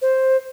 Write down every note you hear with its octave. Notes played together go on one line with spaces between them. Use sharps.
C5